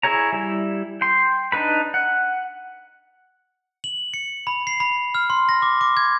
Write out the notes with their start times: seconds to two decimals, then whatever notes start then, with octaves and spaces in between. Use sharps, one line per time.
0.03 E4 G#4 C#5 A#5
0.33 G3 E4
1.01 G5 C6
1.52 D4 D#4 B4 B5
1.94 F#5
3.84 F#7
4.14 C#7
4.47 B5
4.67 C7
4.80 B5
5.15 F6
5.30 C6
5.49 A#6
5.62 D6
5.81 D6
5.97 G#6